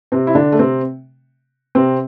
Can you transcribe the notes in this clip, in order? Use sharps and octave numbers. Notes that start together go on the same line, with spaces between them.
C3 C4
E4
D3 D4
A3
C3 C4
C3 C4